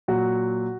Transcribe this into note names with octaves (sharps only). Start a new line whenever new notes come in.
A#2 F#3 F#4